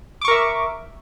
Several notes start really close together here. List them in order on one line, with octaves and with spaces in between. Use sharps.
D6 C#6 A#4 E5